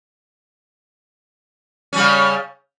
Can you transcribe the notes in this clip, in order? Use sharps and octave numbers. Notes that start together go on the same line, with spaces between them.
C#3 G3 C#4